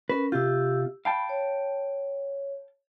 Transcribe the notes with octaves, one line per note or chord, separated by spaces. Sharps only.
C#4 A#4 B4
C3 F4 G4 E6
F5 G5 A5 B5
C#5